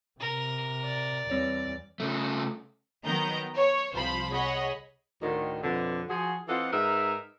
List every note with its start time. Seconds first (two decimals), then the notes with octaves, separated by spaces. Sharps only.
0.20 C3 A#4
0.85 D5
1.30 E2 G3 C4 C#5
2.00 C#3 A3
3.05 D#3 F#3 B3 D#5 A#5 G6
3.56 C#5
3.92 C2 F3 C5 F5 B5
4.31 G#4 C#5 D#5 F#5 B5
5.22 D2 A2 D3 D#3
5.63 F2 B2 D3
6.09 F3 F#4 G#4
6.48 E3 C4 F4 A4 D#5 F#5
6.72 G#2 D#4 G#4 A#4 B4 E5